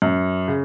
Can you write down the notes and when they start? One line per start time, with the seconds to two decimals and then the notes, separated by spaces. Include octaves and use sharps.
0.02 F#2
0.48 C#3